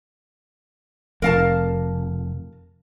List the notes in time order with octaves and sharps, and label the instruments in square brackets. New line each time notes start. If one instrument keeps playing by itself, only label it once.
[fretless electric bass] F1 [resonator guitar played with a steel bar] A#4 F5 A5